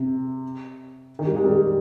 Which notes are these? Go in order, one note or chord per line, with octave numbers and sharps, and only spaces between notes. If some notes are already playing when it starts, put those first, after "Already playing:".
Already playing: C3
D#3
G3
G#3
G3